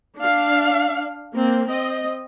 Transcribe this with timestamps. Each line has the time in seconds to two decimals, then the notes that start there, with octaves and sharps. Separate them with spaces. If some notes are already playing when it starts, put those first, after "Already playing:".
0.17 D4 F5
1.34 A#3 C4
1.66 C4 D#5